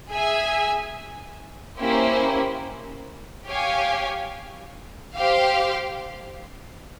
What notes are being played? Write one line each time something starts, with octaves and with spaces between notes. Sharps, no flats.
G#4 E5 G#5
A#3 C#4 E4 G4 C5
G4 C#5 F5 G#5
G4 C5 F5